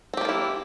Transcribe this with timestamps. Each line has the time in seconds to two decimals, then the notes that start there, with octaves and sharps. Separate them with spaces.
0.14 C4
0.17 G4
0.21 A#3
0.25 F4
0.29 E4